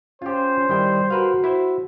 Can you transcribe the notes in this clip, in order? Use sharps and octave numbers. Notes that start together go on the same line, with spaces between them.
C#4 F4 G4 C5
D#3 G3 E4 G5
F#4 A#4 B4 F5
E4 C5